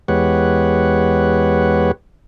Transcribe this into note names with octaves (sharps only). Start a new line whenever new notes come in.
E2 G#3 G4 B4 C#5 F#5